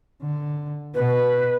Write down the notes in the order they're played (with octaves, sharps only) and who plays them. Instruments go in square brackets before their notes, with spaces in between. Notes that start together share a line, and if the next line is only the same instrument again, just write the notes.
[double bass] D3
[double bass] B2 [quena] B4